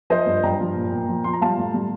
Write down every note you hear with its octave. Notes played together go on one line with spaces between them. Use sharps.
F3 C5 D#5
G2
G2 G5 A#5
F3
A#2
A#2
F3
F3 C6
A#5
G3 F5 A5
A2
G3